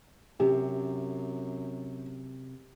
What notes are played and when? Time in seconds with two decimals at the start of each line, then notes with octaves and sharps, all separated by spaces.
0.40 F#2 C3 G4